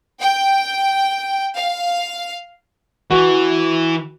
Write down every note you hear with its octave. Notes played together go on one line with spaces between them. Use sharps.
G5
F5
E3 F#4